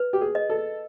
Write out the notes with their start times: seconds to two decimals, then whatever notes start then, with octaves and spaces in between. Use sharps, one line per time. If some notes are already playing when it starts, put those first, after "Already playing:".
Already playing: B4
0.13 G4
0.21 G#4
0.35 D#5
0.50 A4